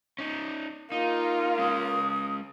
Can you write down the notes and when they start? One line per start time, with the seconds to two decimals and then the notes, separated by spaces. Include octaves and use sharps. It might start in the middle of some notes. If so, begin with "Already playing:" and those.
0.19 C#4 D#4
0.92 A#3 D#4 F4
1.59 G#3 C#4 D#6